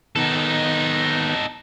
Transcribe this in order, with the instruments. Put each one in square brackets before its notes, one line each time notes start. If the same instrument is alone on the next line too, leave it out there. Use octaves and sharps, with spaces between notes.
[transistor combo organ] D#3 B3 [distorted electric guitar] D#4 A4